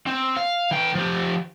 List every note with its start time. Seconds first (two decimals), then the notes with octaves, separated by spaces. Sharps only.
0.07 C4
0.37 F5
0.71 E3 G5
0.95 F3 G4